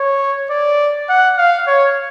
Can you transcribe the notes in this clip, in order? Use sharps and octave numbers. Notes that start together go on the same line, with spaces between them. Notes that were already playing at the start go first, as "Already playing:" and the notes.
Already playing: C#5
D5
F#5
F5
C#5